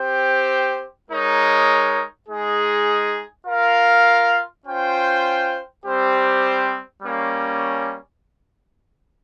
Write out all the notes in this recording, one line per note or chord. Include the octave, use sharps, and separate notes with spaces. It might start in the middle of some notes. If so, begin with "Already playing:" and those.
Already playing: C4 G4 C5 G5
G#3 D#4 A#4 C#5
G#3 D#4 G#4
F4 A#4 F5
C#4 F4 C5 G5
G3 C4 G4 C5
G3 A#3 C#4